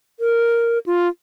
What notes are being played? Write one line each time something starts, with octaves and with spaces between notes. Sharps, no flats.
A#4
F4